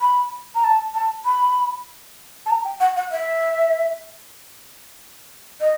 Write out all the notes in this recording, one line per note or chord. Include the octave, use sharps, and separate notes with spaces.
B5
A#5
A5
A5
B5
A5
A#5
G5
F#5
F#5
E5
D#5